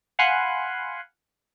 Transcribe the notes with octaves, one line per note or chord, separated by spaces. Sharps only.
F5 F#5 G#5 B5 C6 F#6